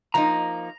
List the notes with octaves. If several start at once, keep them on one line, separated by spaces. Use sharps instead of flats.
F3 A#3 D#4 A#5